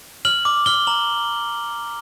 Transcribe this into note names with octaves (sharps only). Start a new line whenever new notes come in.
F6 F#7
D6
F6 G7
A#5 F#7